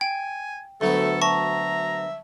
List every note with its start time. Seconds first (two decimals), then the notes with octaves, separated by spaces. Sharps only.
0.01 G5 G#5
0.81 D2 F#3 A3 B3 A4
1.22 E5 A5 A#5 C#6